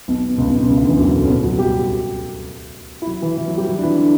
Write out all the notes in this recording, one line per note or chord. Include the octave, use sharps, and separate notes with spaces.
B1 B2
B2
C#2 C#3
B1 B2
B1 B2
C#2 C#3
D2 D3
E2 E3
F#2 F#3
A2 A3
C#4
B2 B3
F#3 F#4
G3 G4
E4
F#3 F#4
E3 E4
E3 E4
F#3 F#4
G3 G4
F#3 F#4
D4
E3 E4
D3 D4